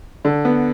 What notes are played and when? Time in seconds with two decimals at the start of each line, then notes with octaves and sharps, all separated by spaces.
0.25 D3
0.45 B3